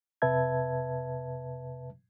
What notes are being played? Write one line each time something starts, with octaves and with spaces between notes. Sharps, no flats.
F2 C3 B4 E5 A5 G#6